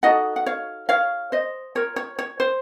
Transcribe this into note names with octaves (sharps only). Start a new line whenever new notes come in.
D#4 F#4 A4 D#5 F#5
F#5
C#5 F5
C#5 F5
C5 D#5
F4 A#4 C#5
C#5
C#5
C5